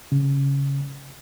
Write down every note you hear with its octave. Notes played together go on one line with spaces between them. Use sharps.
C#3